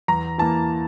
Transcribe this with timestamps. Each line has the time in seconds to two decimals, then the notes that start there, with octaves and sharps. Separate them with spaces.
0.08 E2 A#5
0.38 E3 A#3 A5